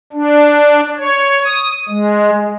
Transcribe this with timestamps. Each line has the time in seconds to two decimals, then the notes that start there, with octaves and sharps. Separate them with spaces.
0.13 D4
0.98 C#5
1.45 D#6
1.89 G#3